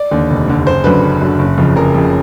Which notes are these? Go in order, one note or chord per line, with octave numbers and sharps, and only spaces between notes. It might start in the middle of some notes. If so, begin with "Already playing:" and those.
Already playing: D5
D#2 D3
F1
D#2 D3
F#1 C5
F#2 D3 B4
F#1
F#2 D3
F#1
F2 C#3
F#1 A#4
F2 C#3